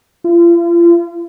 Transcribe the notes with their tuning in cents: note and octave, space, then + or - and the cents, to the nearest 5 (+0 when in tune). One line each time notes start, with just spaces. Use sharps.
F4 -40